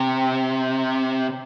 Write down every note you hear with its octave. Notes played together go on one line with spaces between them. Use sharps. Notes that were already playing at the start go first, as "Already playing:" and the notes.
Already playing: C3